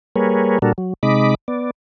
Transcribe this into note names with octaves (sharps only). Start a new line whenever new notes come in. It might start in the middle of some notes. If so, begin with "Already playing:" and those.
G3 A#3 G#4 A#4 B4 C#5
A#2 G3 D4 F#4 A4 A#4
F#3
C3 G#3 D#4 D#5 B5 D6
B3 D5